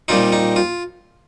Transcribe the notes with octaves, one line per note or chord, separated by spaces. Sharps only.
A#2 G3 C4 D#4 F4
D#4
F4